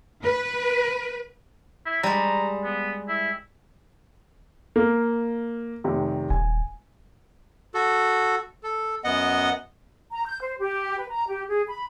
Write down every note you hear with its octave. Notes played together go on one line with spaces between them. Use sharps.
B4
E4
G3 G#3 A#5
B3
E4
A#3
F1 C3 D#3
D#1 G#5
F#4 A4
A4
F#2 B3 D#5 F#5
A#5
G6
C5
G4
B4
A#5
G4
G#4
B5